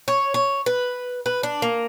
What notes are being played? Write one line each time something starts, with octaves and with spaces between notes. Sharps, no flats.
C#5
C#5
B4
B4
D4
A#3